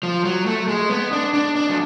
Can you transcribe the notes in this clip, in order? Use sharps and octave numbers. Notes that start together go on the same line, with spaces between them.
F3
F#3
A3
G#3
B3
D4
D4
D4
F#3